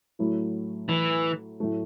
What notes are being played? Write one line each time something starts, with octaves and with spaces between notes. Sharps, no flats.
A2 F#3 A3 E4
E3
A2 F#3 A3